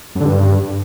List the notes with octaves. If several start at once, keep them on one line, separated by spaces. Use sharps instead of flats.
F#2
D3
G2